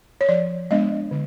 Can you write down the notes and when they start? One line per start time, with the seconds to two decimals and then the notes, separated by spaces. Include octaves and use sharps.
0.21 C#5
0.29 F3 D5
0.71 G#3 B3 D4 D#5
1.11 D3